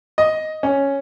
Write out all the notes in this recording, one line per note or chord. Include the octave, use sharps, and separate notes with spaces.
D#5
C#4